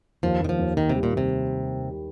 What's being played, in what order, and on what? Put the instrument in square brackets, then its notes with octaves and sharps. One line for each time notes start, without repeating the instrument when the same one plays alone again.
[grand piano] D#2 [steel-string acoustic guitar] F3
[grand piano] D#2 [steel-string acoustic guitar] D#3
[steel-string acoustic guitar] F3
[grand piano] D#2
[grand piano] D#2 [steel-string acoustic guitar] D#3
[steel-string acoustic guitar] C3 [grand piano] G3
[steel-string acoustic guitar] A#2
[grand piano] D#2 [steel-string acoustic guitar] C3